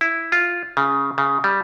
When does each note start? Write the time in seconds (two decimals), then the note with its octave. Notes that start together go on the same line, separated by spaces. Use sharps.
0.01 E4
0.32 F4
0.77 C#3
1.18 C#3
1.44 G3